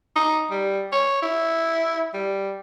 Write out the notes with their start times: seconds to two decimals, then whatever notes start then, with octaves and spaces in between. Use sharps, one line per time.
0.16 D#4
0.51 G3
0.92 C#5
1.22 E4
2.14 G3